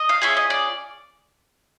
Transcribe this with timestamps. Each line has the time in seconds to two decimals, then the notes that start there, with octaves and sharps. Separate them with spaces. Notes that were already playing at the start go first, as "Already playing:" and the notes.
Already playing: D#5
0.09 F5
0.22 C#4 F4 G#4 E5
0.37 D#5
0.50 D5